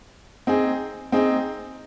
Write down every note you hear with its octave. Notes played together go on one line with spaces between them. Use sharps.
C4 D#4 G#4
C4 D#4 G#4